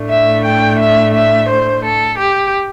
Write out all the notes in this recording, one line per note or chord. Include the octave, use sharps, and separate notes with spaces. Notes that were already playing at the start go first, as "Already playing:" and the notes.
Already playing: A2 A3 D4
E5
G5
E5
E5
C5
A4
G4